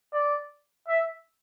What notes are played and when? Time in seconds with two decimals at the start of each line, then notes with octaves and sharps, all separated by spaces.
0.13 D5
0.88 E5